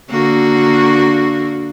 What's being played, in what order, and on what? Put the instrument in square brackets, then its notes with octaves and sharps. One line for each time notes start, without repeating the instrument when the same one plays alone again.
[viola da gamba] D3 A#3 F#4